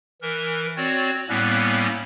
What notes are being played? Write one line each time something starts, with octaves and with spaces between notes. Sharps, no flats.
E3 A#4
C4 F#4 C#5 D5
A2 G3 A#3 B3 C#4 F#6